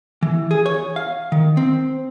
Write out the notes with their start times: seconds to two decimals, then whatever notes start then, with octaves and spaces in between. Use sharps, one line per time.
0.23 E3
0.51 G#4
0.66 C#5
0.96 F5
1.32 D#3
1.57 C4